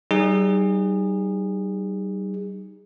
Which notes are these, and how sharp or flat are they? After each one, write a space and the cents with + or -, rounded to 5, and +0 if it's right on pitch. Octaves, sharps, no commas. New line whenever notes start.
G3 -35 D#4 +0 G#4 -25